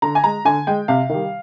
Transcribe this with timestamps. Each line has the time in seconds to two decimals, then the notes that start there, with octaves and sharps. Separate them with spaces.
0.02 D3 A#5
0.15 G#5
0.24 G#3 A#5
0.45 D3 G#5
0.67 G#3 G5
0.88 C3 F5
1.09 D#3 G3